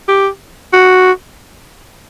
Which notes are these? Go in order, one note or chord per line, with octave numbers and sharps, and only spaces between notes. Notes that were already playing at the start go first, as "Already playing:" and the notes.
G4
F#4